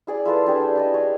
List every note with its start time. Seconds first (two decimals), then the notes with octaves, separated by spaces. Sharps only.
0.07 E4 G#4 D5
0.25 E4 F4 A4 B4
0.46 D4 G4 G#4 E5
0.61 G5
0.76 E4 D5 D#5
0.94 G#4 C#5